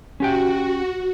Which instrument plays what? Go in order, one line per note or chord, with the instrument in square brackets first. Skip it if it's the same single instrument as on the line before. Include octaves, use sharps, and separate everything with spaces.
[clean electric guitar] C#4 G4 G5 [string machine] F#4